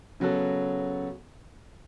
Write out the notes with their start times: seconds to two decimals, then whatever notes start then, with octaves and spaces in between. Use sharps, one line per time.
0.20 C#3 F#3 B3 F#4 A4